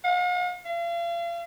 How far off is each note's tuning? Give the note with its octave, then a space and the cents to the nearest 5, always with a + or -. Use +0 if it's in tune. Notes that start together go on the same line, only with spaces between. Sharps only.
F5 +45
F5 -40